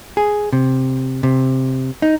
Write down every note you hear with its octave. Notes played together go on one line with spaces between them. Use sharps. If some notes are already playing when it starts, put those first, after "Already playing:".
G#4
C3
C3
D#4